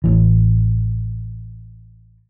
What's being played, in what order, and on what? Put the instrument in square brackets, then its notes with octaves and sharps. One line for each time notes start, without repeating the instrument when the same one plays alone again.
[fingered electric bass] A1 E3